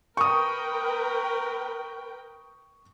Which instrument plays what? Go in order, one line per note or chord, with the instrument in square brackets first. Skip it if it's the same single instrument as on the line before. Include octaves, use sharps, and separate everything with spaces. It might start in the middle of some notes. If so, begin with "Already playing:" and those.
[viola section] A#4 B4 G5 [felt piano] C#6 D#6